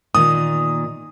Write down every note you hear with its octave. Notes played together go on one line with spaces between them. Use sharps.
A#2 D#3 D#6